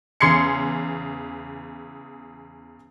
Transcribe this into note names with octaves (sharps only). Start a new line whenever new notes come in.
E2 C#3 C6 G#6 C7 C#7